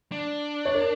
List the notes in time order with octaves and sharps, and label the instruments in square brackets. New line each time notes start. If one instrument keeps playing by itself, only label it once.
[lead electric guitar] D4
[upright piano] C#5
A#4